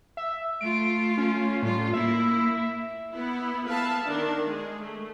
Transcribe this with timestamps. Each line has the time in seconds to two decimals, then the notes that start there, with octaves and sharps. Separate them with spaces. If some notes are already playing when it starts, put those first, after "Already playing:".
0.17 E5
0.61 A3 F4 D7
1.18 C#4
1.63 A2 G3 F4
1.93 A#3 E4 E5
3.13 B3 E4
3.67 B3 B4 E5 F5 A5
4.05 D#3 D4 A#4
4.45 G#3 G#4
4.81 A3